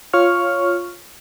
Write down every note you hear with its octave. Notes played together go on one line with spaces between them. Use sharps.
F4 C#5 C#6 F6